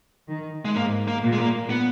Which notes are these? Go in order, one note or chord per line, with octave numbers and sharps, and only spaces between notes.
D#3
G#3
G#2 A#3
A#3
A#2
G#3
A#3
B3